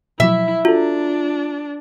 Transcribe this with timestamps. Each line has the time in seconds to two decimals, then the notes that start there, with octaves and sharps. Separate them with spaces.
0.20 B2 F3 F#3 E4 E5
0.65 D4 F4 F#4 A4